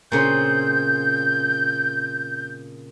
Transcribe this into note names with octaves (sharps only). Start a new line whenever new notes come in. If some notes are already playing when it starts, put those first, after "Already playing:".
A#2 C#3 C4 G6